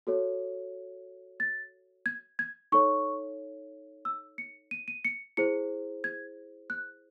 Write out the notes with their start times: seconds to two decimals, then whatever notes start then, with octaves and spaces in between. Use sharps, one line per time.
0.07 F#4 A4 C#5
1.40 A6
2.06 G#6
2.39 G#6
2.72 D#4 A4 C#5 C#6
4.05 E6
4.38 C#7
4.71 D#7
4.88 D#7
5.05 C#7
5.37 E4 G#4 C5 C#7
6.04 G#6
6.70 F#6